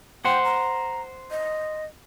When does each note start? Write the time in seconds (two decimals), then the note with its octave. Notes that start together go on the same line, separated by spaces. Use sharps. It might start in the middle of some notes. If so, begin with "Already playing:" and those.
0.25 C5 F#5 G5
0.44 A#5
1.31 D#5